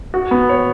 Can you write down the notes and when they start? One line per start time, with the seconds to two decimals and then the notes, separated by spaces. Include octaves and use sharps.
0.14 F#4
0.31 B3
0.49 C#5